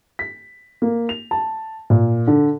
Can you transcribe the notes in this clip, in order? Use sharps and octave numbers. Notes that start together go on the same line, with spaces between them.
B6
A#3
F7
A5
A#2
D3